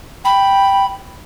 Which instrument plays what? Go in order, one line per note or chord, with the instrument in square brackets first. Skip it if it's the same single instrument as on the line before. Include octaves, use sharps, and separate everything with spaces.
[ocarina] G5 [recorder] B5